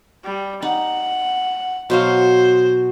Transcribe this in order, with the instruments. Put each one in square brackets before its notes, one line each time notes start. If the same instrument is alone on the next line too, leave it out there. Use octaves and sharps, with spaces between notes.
[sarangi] G3
[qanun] D#4 [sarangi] F#5
[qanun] B2 F#3 F5 [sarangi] C5